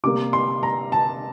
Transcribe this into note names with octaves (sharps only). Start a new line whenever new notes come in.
C3 G3 A#3 D6
C6
A#5
A5